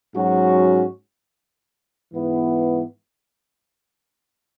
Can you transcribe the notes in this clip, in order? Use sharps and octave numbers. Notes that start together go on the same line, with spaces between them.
G#2 F#3 C#4 F#4
G#2 E3 B3